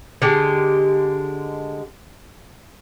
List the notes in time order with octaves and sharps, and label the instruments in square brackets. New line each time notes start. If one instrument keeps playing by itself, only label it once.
[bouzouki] D3 G#3 G4